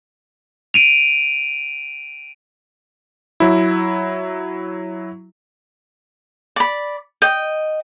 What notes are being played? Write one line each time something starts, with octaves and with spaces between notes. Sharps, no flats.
D7 D#7 F7
F#3 E4
D5 B5
D#5 G5